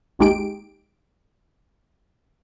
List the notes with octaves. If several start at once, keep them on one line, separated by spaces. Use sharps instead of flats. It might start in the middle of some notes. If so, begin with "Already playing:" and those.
G#1 D#2 G#3 D#4 G4 D7